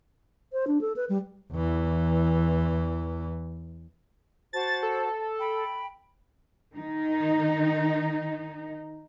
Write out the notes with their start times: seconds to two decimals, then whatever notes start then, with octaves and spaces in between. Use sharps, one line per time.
0.53 C5
0.67 D4
0.81 A4
0.96 B4
1.09 G3
1.53 E2 E3
4.53 F#4 C5 A5 A6
4.83 A4
5.39 G5 B5
6.74 D#3 D#4